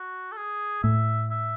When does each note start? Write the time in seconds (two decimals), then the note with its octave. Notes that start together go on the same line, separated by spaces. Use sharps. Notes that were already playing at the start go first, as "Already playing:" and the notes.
Already playing: F#4
0.32 A4
0.37 G#4
0.83 A2 E5
1.30 E5